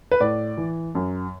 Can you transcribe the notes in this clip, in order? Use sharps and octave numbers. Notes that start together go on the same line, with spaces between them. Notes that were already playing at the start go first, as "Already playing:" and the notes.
B4
A2 D5
E3
F#2